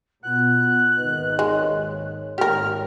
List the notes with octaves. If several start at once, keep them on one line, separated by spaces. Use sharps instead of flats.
B2 B3 F4 F#5 F#6
G#1 D#2 D#3 B4 D#5
G#3 C#5
G#1 G#2 G4 A#4 F6